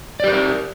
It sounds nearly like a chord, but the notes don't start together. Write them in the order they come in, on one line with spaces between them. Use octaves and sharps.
D5 G4 B4 A#4